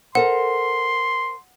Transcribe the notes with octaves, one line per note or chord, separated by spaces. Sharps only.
A4 A#4 C5 F#5 C6